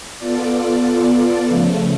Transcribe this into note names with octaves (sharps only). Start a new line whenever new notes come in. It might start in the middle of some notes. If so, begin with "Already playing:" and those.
B3 F4 A4 D5
C#3 F3 A3